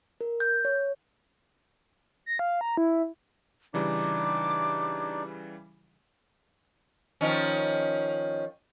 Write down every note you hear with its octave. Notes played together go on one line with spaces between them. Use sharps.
A#4
G6
C#5
A#6
F5
A#5
E4
C#3 E3 G3 D4 D#4 D5 D6
D#3 F3 C#4